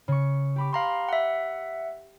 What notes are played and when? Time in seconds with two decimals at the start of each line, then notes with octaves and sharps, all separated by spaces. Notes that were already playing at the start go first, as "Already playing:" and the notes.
0.08 C#3 C#6
0.56 G4 B5 D6
0.73 F5 A#5 C6
1.09 E5 F#5